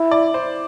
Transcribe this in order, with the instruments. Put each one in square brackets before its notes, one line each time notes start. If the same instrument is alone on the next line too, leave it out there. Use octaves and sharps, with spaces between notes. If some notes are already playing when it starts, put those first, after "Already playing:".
Already playing: [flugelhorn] E4
[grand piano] D5
C5